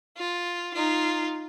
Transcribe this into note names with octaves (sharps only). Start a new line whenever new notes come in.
F4
D#4 F4